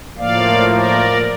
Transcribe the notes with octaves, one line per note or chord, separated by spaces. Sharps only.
A2 F3 A#3 D5 F5
A#4 D5